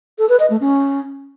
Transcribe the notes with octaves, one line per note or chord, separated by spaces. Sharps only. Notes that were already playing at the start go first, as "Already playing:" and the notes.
A4
B4
D#5
A3
C#4